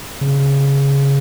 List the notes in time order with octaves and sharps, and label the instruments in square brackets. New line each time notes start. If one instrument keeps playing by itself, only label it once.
[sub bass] C#3